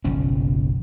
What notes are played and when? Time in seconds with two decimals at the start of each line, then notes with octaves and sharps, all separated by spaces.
0.04 F#1 B1 F3 C#4